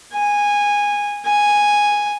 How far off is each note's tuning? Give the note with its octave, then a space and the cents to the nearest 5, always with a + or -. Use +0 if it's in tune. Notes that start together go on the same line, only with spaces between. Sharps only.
G#5 -15
G#5 -5